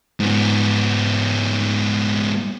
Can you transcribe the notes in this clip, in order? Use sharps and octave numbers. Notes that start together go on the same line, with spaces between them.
G#2 B3